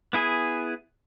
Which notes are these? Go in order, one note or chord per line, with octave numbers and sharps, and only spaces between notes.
B3 E4 G#4 G#5